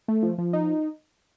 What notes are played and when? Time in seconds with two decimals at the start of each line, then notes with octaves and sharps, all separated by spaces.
0.08 A3
0.23 F3
0.38 F3
0.53 D#4